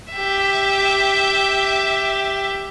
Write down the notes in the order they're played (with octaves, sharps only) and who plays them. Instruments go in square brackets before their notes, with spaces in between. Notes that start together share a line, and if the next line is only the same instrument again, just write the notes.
[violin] G4 E5